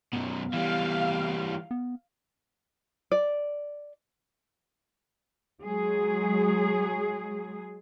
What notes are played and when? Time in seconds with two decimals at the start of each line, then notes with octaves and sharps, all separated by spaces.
0.13 F#2 B2 B3
0.53 E3 G3 F5
1.71 B3
3.12 D5
5.63 F#3 G#3 G#4